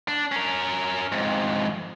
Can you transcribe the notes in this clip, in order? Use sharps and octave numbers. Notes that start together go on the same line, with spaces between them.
D4
C#4 A#4
F2 G#2